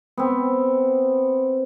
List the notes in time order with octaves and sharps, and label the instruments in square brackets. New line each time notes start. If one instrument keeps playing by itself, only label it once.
[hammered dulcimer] B3 C4